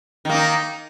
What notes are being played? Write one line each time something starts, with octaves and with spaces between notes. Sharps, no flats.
D#3 A#3 D#4